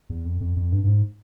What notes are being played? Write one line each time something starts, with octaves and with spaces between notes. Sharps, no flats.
E2
F2
F2
F2
G2
G2
G#2